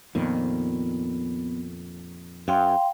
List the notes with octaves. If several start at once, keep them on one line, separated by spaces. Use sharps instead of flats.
F2 A#2 D#3 B3
F#2 F5 G5 C6